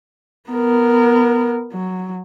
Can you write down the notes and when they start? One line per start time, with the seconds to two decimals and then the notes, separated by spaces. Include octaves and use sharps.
0.50 B3 A#4
1.72 F#3